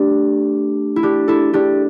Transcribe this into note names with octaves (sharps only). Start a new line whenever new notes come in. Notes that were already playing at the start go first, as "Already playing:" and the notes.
Already playing: A3 D4 G4
E4
D4 G4
E4 A4
D4 G4